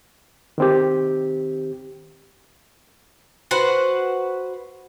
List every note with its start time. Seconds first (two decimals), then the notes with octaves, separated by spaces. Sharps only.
0.58 D#3 C4 G4
3.51 F#4 B4 C5 F#5